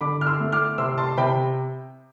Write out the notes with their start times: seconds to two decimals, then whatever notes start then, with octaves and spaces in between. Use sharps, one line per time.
0.01 D3 B5 D6
0.21 F6
0.27 C6 E6
0.40 A3
0.52 D6 F6
0.78 C3 C6 E6
0.98 A5 C6
1.17 C3 G5 B5